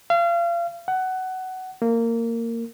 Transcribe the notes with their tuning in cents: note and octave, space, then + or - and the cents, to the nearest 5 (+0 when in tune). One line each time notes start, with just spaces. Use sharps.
F5 -35
F#5 +15
A#3 -15